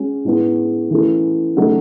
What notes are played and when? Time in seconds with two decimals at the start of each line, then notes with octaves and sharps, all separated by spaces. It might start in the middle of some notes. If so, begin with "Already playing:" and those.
Already playing: G#3 C#4 F#4
0.24 A2 G#3 B3
0.90 E3 A3 C#4 F#4 A4
1.56 C#3 F#3 A3 D#4